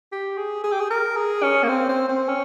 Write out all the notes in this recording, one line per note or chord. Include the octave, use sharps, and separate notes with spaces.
G4
G#4
G#4
G4
G#4
A#4
G#4
C#4
A#3
C4
C4
C4
C#4